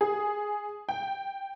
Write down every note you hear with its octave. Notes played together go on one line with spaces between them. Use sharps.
G#4
G5